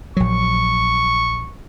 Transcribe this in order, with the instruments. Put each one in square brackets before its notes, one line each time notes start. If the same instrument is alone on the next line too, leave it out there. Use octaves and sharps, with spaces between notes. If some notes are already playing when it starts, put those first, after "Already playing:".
[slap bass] A#1 F#3 [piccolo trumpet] C#6